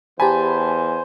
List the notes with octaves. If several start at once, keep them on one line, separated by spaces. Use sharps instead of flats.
E2 G4 C5 G#5 A5 B5